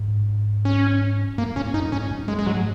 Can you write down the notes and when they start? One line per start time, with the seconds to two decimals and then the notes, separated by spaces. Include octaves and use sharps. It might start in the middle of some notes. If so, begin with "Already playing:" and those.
Already playing: G#2
0.65 C#4
1.38 F#2 A#3
1.56 G#2 C#4
1.74 F#2 D#4
1.92 G#2 C#4
2.11 F#2
2.28 G#3
2.39 G#3
2.46 G#2 F#3